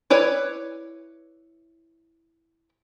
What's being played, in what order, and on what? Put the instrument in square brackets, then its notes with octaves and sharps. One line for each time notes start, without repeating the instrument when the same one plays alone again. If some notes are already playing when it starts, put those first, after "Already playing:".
[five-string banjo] E4 B4 C#5 D5